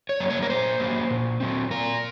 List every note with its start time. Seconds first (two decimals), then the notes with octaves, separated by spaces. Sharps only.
0.09 C#5
0.20 F#3 A#3
0.30 C#5
0.42 A#4
0.50 A#2 C5
0.80 F#3 A#3
1.10 A#2
1.40 F#3 C4
1.71 A#2 A#4